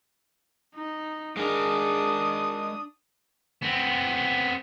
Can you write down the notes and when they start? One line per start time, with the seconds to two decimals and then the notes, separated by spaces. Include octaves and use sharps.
0.75 D#4
1.37 G#3 D4 A#4 D#6
3.62 B3 C4